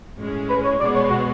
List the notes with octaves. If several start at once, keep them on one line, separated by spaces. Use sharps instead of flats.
A2 G#3 C#4
B4
C#5
B2 G#3 B3 D5
C#5
F#4